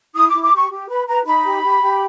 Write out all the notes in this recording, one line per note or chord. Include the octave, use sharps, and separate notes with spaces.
E4 D#6
D6
E4
D6
G4 C#6
G4
B4 B5
B4 A#5
D#4 B5
G4
G4
G4